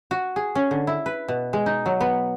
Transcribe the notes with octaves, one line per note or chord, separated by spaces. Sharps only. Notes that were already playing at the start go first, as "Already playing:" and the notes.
F#4
G#4
C#4
D3
E4
B4
B2
G#3
D#4
F#3
B3